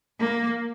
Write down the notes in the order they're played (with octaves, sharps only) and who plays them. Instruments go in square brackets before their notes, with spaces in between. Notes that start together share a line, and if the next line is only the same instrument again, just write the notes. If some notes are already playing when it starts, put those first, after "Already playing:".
[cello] A#3